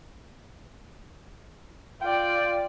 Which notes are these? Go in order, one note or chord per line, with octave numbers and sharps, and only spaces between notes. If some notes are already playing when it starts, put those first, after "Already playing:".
F4 D5 G5